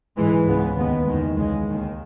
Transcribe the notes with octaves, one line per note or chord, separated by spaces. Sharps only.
G#2 E3 G#3
C#2 C#3 G#3 B3
D#2 D#3 G#3 B3
E2 D#3 G#3
C#2 C#3 G#3
D#2 D#3 A#3